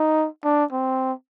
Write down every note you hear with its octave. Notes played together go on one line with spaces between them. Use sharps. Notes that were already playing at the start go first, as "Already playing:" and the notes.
Already playing: D#4
D4
C4